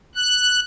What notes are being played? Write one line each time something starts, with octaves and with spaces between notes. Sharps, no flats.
F#6